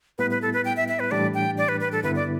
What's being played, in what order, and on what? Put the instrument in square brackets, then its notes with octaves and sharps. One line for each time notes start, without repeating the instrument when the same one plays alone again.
[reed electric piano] A2 G3 B3 E4 [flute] B4
[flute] B4
A4
B4
G5
E5
E5
B4
[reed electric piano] A2 E3 G3 D4 [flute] D5
[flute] G5
D5
B4
B4
A4
[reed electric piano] G2 D3 B3 E4 [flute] B4
[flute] D5